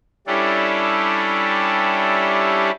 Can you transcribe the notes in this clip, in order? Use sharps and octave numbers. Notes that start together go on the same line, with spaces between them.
G3 C#4 D4 E4 G4 A4